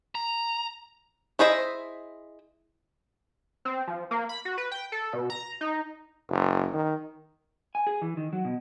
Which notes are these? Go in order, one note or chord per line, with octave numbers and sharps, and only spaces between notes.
A#5
E4 G#4 C5 D#5 E5
C4
F3
A#3
B5
F#4
B4
G5
A4
B2
A#5
D#4
F#1
D#3
G#5
G#4
E3
D#3
F#3
B2